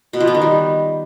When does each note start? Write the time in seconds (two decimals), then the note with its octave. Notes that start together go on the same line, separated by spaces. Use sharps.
0.13 B2
0.20 F3
0.27 B3
0.34 D#3
0.42 G3